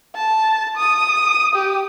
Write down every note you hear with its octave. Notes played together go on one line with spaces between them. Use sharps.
A5
D#6
G4